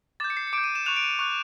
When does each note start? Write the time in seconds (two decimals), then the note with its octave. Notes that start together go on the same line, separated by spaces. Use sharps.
0.20 D6 G6 A6
0.30 C#7
0.37 C7
0.47 C#7
0.53 D6 D7
0.58 G6
0.64 D#7
0.75 E7
0.86 C#6 F#6 F7
0.96 D7
1.03 D#7
1.19 C#6 F#6 F7